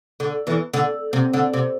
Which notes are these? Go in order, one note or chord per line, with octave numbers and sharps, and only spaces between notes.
D3
E2 E3
D3
C3
D3
C3